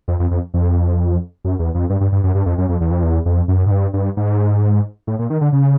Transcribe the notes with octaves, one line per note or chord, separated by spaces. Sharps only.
F2
F2
F2
F2
F#2
E2
F2
G2
G2
G2
F#2
G2
F2
F#2
F2
E2
F2
E2
F2
F#2
G#2
G2
G2
G#2
A2
A#2
D#3
D3
C#3